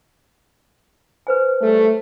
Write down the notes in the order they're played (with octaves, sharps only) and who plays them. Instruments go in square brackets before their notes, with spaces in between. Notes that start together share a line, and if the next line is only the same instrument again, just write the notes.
[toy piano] B4 C5 G#5
[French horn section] G3 A3